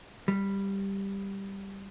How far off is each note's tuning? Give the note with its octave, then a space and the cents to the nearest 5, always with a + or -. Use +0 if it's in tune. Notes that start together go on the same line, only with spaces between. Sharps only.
G3 +5